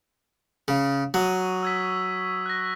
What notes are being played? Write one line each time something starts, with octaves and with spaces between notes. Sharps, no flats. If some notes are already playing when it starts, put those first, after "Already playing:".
C#3
F#3 C#6 D#6
E6 G#6 B6
F#6 A#6